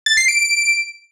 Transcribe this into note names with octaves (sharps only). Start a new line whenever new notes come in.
A6
C7
D7